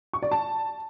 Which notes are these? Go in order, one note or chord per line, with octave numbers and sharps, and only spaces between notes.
C#6
D5
A5